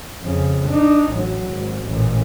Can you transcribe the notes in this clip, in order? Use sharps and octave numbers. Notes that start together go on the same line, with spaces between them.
F2 C#3
D4 D#4
A1 F#3
G#1
A1 A#2